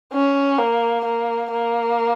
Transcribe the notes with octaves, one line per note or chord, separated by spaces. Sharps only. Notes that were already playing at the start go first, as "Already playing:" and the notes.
C#4
A#3
A#3
A#3